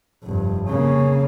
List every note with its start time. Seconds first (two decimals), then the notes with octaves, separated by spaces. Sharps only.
0.24 F1 G2
0.67 C#3 A#3